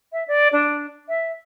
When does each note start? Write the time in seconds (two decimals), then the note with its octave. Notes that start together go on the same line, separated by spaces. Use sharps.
0.12 E5
0.27 D5
0.52 D4
1.08 E5